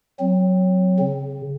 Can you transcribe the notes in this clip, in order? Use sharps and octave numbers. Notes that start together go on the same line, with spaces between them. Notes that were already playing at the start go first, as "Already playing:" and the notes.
F#3 C4
C#3